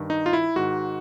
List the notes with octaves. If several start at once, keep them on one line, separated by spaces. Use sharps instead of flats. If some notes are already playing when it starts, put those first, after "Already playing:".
Already playing: G2 D#3
D#4
F4
E4
G#2 D#3 F#4